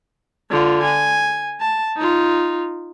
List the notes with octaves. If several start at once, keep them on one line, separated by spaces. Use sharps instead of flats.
D3 F4
G#5
A5
D#4 F4